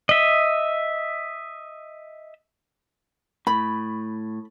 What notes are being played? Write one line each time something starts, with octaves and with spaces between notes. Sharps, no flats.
D#5 E5
A2 B5